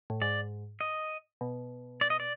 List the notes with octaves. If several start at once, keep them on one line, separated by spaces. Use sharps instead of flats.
A2
G#2 D5
D#5
B2
D5
D#5
D5